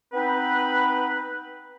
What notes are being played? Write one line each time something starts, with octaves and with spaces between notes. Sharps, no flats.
B3 C4 D#4 B4